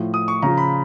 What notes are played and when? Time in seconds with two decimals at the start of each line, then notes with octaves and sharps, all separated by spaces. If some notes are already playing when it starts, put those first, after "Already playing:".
Already playing: A2 F3
0.14 D#6
0.28 C#6
0.42 C#3 F3 A#5
0.58 B5